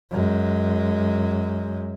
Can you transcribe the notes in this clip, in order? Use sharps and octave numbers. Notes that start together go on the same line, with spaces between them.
F#2 G#3